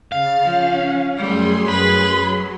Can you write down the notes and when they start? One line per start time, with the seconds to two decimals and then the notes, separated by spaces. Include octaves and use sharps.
0.12 C#3 F5 A6
0.44 F3 C#4
1.17 F#2 G3 A3 G#4 C6
1.68 B4 B5
2.14 F#3